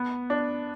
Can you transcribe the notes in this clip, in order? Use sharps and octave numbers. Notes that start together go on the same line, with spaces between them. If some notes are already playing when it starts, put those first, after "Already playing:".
Already playing: B3
D4